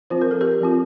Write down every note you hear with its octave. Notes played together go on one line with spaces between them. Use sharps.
F3 C4 F4 C5
A#4
A4
G4 A#4
F3 C4 F4